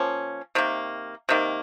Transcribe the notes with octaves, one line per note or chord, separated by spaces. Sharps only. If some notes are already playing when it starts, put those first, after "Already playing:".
Already playing: F3 A#3 C#4
C3 D#3 A#3
C3 D#3 A#3